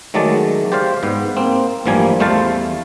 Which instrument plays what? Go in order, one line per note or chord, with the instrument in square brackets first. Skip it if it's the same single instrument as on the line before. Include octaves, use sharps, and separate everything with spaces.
[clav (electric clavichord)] D#3 F#3 G#3 A3 D5 A5
G4 C5 D5 F5
G#2 B3
A#3 C4
A1 G2 F3 G3 A#3 G#5
E2 G3 A3 C5 F5 A5